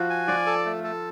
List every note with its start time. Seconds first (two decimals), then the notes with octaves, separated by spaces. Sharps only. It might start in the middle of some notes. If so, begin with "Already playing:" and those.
Already playing: F3 F4 F#4
0.10 G#5
0.28 F3 F4 D5
0.46 A4
0.66 A3
0.84 A4